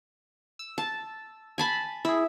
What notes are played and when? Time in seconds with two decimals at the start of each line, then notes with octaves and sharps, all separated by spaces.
0.59 E6
0.78 A5
1.58 G#5 A5 B5
2.05 E4 G#4 E5